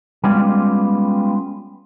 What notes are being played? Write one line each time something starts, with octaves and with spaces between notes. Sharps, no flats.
G3 G#3 B3 C#4 F4 D5